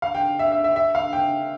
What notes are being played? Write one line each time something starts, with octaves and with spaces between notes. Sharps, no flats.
F5
G5
E5
E5
E5
E5
F5
G5